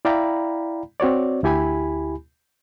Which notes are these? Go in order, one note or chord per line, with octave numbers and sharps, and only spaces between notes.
E4 D5 F5 G5 A#5 B5
C4 F#4 C#5 D5
D2 E4 G4 G#5 B5